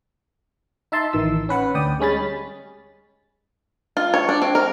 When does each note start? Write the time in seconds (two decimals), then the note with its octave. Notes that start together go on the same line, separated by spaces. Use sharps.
0.92 D#4 E5 A5 C6
1.13 A1 D#3 E3 E6
1.49 C#4 B4 F#5
1.75 D2 D5 G5 D#6
2.00 G3 G#3 C#4 B5 A6
3.97 F4
4.14 C#5
4.29 D4
4.42 C4
4.55 A#4